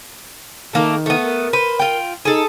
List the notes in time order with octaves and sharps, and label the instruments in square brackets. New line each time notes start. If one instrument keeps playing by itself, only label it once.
[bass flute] D#3 [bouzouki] A3 A#3 A4
[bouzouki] A3 B3
[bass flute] A#4
[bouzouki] B4 C5
F4 G5
[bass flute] D#4 [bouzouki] G#4 A4